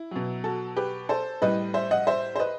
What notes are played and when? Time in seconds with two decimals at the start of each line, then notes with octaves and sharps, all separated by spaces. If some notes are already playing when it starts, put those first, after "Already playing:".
Already playing: E4
0.11 B2 F#3
0.44 F#4 A4
0.76 G4 B4
1.09 A4 C5
1.42 A2 G3 B4 D#5
1.74 C5 E5
1.91 D#5 F#5
2.07 C5 E5
2.36 C5
2.39 B4 D#5